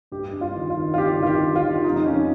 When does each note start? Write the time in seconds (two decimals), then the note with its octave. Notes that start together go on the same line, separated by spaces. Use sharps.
0.12 G2 G4
0.33 G2
0.41 F4
0.55 D#3
0.70 F4
0.77 D#3
0.94 F4
0.98 G2 G4
1.20 D#3 F4
1.27 G4
1.41 D#3
1.56 F4
1.62 D#3
1.84 F2 D#4
1.96 D#4
2.06 F2 C#4